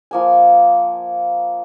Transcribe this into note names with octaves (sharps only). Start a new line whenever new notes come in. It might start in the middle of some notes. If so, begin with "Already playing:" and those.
F3 A#3 G#5